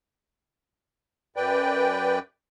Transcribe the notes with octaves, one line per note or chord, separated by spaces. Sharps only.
F#2 B4 D5 G5